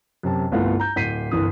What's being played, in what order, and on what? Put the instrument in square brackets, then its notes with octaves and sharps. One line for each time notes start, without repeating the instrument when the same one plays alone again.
[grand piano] F#2 C3 A5
G1 C2 A3 B3 F4 F#5
A#5 G6
D1 G6 B6 C7 D#7
G1 C2 E3 D#6